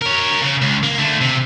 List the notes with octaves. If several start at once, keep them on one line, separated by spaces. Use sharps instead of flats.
A#4 C#5
C#3
C#2
A#3
D3 A3
C3